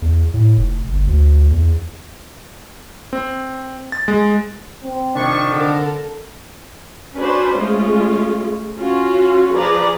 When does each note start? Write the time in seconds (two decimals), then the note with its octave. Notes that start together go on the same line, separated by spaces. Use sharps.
0.02 E2
0.34 A2
0.57 F1
0.92 G1
1.07 D2
1.51 E2
3.13 C4
3.92 A6
4.08 G#3
4.84 C4
5.15 C3 D#3 F3 D4 C#6
5.52 D3 A4 A#4
7.16 C#4 D4 F#4 B4 C5
7.56 G#3 A3 C#4 F4
8.80 C#4 F4 F#4
9.53 F3 G#4 B4 D5 A#5